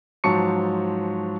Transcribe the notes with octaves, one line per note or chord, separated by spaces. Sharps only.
G#2 F3 F#3 A5 C#6 C#7